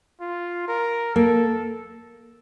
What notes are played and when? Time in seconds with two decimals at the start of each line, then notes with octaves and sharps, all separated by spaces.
0.21 F4
0.68 A#4
1.15 A#3 A4